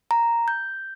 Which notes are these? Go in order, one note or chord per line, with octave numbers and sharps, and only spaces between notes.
A#5
G6